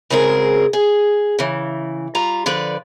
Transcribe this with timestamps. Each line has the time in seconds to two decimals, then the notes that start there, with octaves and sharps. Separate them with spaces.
0.10 C#3 F#3 G#3 C4 G#4 A#4
0.73 G#4
1.39 C#3 E3
2.15 G3 F4 A#5
2.46 D3 F3 B4 D5